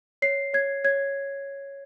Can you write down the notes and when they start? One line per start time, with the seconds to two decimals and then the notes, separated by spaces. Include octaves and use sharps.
0.22 C#5 C7
0.54 C#5 G#6
0.84 C#5 G#6